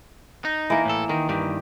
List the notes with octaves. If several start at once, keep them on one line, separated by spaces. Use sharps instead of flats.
D#4
E3 A#3
A2 A4
D#3 A#4
G2 D#3 G4